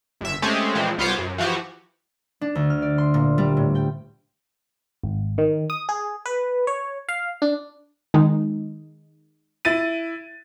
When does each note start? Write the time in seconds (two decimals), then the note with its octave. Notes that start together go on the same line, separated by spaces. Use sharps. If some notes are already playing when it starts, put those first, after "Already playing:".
0.21 G1 E5
0.42 G#3 A3 C4 C#4 G4 G#4
0.75 A#2 E3 F3 G#3 C4
0.98 C2 B3 F4 C5 C#5 D6
1.18 F#2
1.38 E3 F3 F#4 G4
2.41 D4
2.55 D2
2.70 F6
2.82 D5
2.98 C6
3.14 A#2
3.38 G3
3.57 A2
3.75 G5
5.04 G#1
5.38 D#3
5.70 D#6
5.89 G#4
6.26 B4
6.67 C#5
7.09 F5
7.42 D4
8.14 D#3 G#3 D#4
9.65 E4 A6 D#7